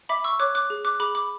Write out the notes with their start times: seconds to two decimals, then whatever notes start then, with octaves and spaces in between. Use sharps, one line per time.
0.09 E5 B5 D6
0.24 C#6 E6
0.39 C#5 D6 F#6
0.55 D6 F#6
0.70 G#4
0.85 D6 F#6
1.00 G#4 B5 D6
1.15 B5 D6